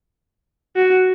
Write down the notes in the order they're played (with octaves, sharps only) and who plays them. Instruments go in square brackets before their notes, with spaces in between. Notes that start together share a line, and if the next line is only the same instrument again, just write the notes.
[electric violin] F#4